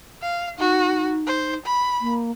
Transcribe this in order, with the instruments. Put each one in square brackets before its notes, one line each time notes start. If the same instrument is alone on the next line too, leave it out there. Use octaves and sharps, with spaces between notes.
[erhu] F5
[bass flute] D#4 [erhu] F#4
[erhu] C5
B5
[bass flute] A#3